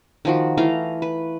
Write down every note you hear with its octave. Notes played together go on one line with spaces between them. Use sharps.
D#3 F3 F#4
E3 A3 F5 A#5
B4